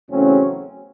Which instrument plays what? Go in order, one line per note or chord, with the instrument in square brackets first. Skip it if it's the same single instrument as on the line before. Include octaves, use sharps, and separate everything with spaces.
[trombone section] E2 C#3 F#3 A3 C4 C#4